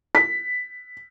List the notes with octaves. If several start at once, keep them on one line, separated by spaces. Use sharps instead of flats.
B6